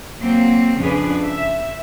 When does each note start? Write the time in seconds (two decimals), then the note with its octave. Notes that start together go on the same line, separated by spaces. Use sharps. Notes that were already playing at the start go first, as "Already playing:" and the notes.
0.19 F#3 A#3 C4
0.78 F2 C#3 F3 D4 G#4 B4
1.23 E5